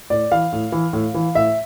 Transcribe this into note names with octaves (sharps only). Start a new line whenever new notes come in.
A2 D5
E3 F5
A2
E3
A2
E3
A2 E5